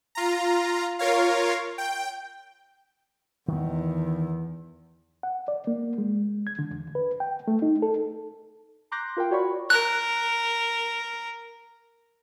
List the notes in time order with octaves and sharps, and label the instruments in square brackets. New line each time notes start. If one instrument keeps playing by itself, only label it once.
[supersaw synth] F4 A#5
F4 A#4 C#5 F5
G5
[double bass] E2 [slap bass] D#3 B3
[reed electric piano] F#5
D5
A#3
G#3
G#6
D3
E2
B4
G5
A3
D#4
A4
[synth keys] A#5 C6 D6 F#6 G6 A#6
F4 A#4 F5 G5
F#4 C#5 D5 B5 C#6
[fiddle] A#4 [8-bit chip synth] F#6